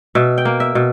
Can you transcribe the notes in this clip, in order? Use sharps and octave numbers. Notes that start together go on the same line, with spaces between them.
B2 E5
G5
A#3
E5
B2